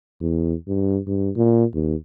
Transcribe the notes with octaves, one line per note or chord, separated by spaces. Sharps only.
E2
G2
G2
A#2
D#2